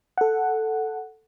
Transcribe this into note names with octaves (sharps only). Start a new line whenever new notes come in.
A4 F#5